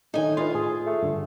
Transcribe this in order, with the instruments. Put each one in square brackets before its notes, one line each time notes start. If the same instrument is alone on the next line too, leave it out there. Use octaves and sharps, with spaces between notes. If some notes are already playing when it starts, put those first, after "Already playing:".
[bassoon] A2 [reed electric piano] D#3 D4 [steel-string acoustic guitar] D#4 G#5
[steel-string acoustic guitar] F4 [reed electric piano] B4 D#5 C6
[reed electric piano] A2 [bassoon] G#4
[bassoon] A3
[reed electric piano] G2 D3